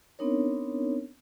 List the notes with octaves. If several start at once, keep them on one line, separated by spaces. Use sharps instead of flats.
B3 C4 D4 D#4 A#4 C#5